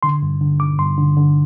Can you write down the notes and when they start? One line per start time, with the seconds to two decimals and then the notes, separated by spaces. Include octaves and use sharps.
0.03 D3 C6
0.23 G2
0.41 D3
0.60 D3 D6
0.79 G2 C6
0.98 D3
1.17 D3